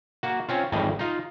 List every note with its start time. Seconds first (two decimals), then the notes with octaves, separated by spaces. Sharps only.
0.23 A#3 F#4
0.49 C4 C#4 F4
0.72 G#1 F2 A2 E3 G3 D#5
0.99 D#4 F4